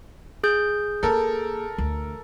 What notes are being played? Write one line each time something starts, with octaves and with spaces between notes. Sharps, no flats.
G#4 G6
A#3 A4 A#4
D2